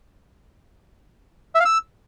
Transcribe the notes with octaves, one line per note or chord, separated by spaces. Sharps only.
E5
F5
E6